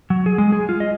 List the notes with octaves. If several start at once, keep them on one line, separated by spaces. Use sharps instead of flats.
F#3
G#4
G#3
G#4
F4
D#5